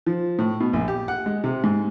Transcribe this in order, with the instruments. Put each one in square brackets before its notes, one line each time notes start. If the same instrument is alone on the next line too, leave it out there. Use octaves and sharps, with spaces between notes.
[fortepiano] F3
A2
B2
A#1
G4
F#5
G#3
C3
G#2